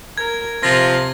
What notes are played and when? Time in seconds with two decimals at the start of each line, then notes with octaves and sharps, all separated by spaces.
0.18 A#4 G#6
0.63 C3 F3 F4 A#6